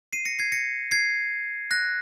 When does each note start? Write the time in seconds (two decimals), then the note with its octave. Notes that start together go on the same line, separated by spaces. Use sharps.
0.13 C7 D#7
0.25 A#6 C#7
0.39 G#6 C7
0.52 A#6 C#7
0.91 G#6 C7
1.71 F#6 A#6